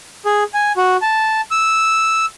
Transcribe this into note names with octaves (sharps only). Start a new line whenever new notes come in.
G#4
G#5
F#4
A5
E6